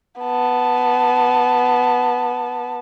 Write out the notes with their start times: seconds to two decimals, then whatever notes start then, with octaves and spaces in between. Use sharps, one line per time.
0.21 B3 A5